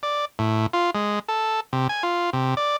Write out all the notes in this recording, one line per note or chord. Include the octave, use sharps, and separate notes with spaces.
D5
A2
F4
G#3
A4
C3
G#5
F4
C3
D5